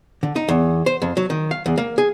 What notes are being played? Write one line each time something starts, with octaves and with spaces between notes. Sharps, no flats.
D3
D#4
E2
C5
F2
F#3
D#3
F5
E2
A#3
G#4